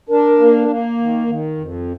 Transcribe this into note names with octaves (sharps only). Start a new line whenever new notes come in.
D4 A#4
A#3
A#3
D#3
D#3
F2